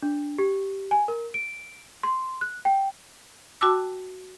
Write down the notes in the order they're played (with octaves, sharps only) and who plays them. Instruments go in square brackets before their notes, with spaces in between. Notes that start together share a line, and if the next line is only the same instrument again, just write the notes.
[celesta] D4
G4
G#5
A#4
D7
C6
F#6
G5
[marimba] F#4 G5 A5 D6 E6